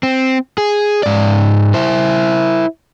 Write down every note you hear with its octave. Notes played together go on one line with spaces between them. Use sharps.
C4
G#4
G#2 D5
E4 C5